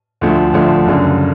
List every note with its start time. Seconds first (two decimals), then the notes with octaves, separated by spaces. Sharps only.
0.21 D2 D3 F3 A3
0.53 D2 D3 F3 A3
0.86 F#1 F#2 D3